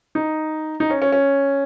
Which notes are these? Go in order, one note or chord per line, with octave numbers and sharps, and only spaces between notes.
D#4
D#4
C#4
C#4
C#4